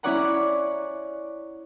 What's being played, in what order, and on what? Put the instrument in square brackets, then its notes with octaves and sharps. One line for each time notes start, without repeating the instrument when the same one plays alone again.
[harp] C#4 E4 C#5 D5 F#5 A#5